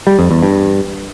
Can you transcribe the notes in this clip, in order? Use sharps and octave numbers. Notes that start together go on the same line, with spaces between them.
G3
F2
E2
G2